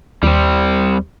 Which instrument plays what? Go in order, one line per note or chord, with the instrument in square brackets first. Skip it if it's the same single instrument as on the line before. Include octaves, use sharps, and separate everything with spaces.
[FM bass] D#2 [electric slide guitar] G3 C4